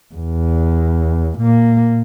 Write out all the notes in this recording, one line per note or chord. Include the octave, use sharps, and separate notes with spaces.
E2
A#2 A#3